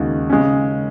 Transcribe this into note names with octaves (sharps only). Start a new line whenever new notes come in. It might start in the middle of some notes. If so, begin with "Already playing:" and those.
Already playing: D#2 C#3 G#3 D#4 F#4
C#3 G#3 C#4